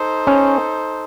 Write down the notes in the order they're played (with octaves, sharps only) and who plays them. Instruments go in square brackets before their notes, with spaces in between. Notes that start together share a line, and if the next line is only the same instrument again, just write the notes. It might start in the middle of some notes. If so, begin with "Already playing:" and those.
Already playing: [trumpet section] D#4 A4 C5
[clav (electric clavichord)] C#4